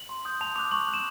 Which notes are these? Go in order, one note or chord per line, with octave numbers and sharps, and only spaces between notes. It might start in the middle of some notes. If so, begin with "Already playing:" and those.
Already playing: F#7
C6
D#6 G6
A5 F7
D6 F#6 F7
C#6 F#7
F#6
E7